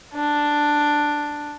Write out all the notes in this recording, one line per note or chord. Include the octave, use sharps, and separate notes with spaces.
D4